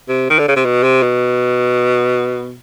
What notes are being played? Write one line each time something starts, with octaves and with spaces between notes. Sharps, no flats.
C3
D#3
D3
C#3
C3
B2
C3
B2